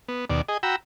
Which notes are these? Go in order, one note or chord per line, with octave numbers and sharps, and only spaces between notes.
B3
D#2 B2 D5
G#4 D#5
F#4 G5 A#5 B5 E6